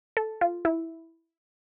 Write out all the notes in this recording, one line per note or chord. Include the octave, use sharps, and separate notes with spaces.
A4
F4
E4